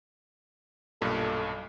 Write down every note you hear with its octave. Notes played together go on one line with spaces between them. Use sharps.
B1 G2 A#2 A4